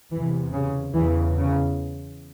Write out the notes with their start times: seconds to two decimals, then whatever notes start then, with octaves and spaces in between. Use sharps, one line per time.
0.11 E2 C3 E3
0.52 C#3
0.94 E2 C#3 E3
1.36 C#3